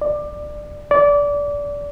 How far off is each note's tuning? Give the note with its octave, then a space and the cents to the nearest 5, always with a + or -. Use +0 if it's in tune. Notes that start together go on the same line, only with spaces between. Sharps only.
D5 +20
D5 -20